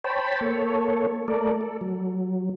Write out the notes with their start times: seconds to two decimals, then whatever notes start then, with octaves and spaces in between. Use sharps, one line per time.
0.04 C5 C#5 G5 A5 B5
0.41 A#3 A4 C#5
1.28 A3 A4 A#4 D5
1.61 A4
1.81 F#3